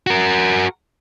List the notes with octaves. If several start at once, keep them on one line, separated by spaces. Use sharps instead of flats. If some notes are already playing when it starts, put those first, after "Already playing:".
F#4 A#4